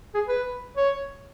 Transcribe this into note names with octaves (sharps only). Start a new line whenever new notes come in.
G#4
B4
C#5